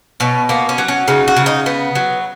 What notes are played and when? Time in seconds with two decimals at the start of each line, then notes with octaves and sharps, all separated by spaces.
0.20 B2 C#4
0.49 A#3 B3
0.69 C#4
0.78 F#3
0.88 C#4
1.08 C#3 D#4
1.28 F#4
1.36 C#3
1.46 D#4
1.66 B3
1.95 F#3